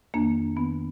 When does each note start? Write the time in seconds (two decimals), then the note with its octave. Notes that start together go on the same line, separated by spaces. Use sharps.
0.14 F2 D#3 A#3 D4
0.57 F2 D#3 B3